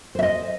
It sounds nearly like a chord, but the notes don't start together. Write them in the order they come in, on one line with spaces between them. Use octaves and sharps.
C5 E5 D#5